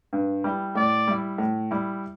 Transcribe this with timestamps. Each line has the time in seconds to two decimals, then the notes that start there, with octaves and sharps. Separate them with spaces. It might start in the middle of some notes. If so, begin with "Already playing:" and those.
0.13 G2
0.44 G3 E4 G4
0.75 A2 D5
1.08 G3 E4
1.38 A2
1.71 G3 E4